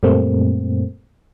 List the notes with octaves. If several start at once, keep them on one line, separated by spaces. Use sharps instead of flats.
F#2 A#2 G3 A3 A#3 C4